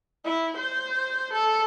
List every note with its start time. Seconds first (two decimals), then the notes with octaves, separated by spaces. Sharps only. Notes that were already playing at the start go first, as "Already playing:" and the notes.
0.24 E4
0.57 C5
1.33 A4